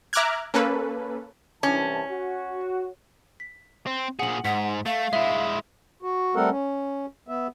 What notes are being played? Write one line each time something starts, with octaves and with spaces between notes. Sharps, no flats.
E5 A#5 D6 F6 F#6 G#6
A#3 C#4 A4 B4
C2 E3 C#4 A5
F#4
B6
C4
A#2 G#4 F#5 F#7
G#2 F#5 B6
A3 F5
G#3 E4 E5
F#4
G3 A3 C4 A4 A#4 F#5
C#4
B3 E5